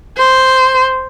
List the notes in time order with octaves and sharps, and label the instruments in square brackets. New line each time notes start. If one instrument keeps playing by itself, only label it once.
[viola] C5